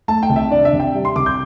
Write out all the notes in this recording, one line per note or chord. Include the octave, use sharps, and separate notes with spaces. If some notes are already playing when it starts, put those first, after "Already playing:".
A3 A5
G5
C2
E5
D4 D5
E5
C3
G5
G3
C6
C2 D6
G6